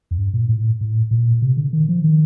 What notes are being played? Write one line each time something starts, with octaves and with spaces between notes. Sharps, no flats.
F2
G2
A#2
A2
A2
A#2
C3
D3
D#3
F3
D#3